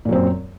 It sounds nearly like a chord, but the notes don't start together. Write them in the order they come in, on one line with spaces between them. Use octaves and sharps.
A#2 F#3 C4 F#2